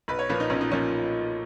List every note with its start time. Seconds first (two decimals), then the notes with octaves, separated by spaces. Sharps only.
0.08 B1 B4
0.19 C#5
0.29 A#2 F3 B4
0.40 D#4
0.50 B1 C#4
0.61 D#4
0.71 A#2 F3 C#4